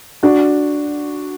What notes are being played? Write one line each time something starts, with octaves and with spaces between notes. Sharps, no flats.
D4 F#4